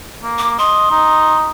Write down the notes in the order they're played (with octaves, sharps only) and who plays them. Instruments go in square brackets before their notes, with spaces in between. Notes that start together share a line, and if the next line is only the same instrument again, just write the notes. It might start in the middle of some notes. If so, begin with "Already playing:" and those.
[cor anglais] A#3
[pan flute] D6
[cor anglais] D#5 [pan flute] C6
[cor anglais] D#4